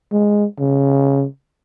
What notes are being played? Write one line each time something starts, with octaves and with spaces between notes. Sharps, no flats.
G#3
C#3